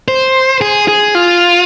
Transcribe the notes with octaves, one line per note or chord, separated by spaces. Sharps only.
C5
G#4
G#4
F4